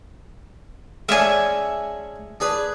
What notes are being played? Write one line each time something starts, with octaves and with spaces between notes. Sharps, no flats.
G#3 C#4 D4 E5 G#5
D4 G#4 B4